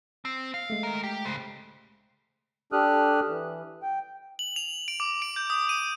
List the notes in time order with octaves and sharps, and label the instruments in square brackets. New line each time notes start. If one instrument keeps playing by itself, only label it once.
[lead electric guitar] C4
F5
[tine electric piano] G#3 A3
[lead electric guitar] D#3 A#4
G4
C#3 C5
[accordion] D4 G4 A4 D#6 F6 F#6
E3
G5
[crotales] F#7
F7
D7
D6
D7
G6
D#6
D#7